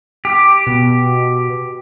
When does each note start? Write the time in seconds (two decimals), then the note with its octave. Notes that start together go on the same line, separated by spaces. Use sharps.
0.25 G4
0.67 B2